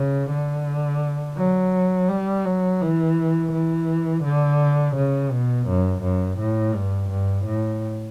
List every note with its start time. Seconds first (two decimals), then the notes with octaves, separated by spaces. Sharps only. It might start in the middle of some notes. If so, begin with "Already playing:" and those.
Already playing: C#3
0.31 D3
1.37 F#3
2.09 G3
2.45 F#3
2.81 E3
3.52 E3
4.23 D3
4.96 C#3
5.31 B2
5.67 F#2
6.02 F#2
6.39 A2
6.74 G2
7.10 G2
7.45 A2